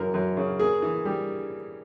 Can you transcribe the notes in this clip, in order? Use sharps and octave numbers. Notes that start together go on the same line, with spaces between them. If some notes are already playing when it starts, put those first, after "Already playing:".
Already playing: F#2 C#3 E3 A#4
F#2
C#3
A#3 G#4
E3
G3